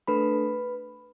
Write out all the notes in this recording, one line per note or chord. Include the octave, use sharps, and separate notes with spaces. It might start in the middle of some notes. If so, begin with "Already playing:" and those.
A3 D4 A4 B4 B5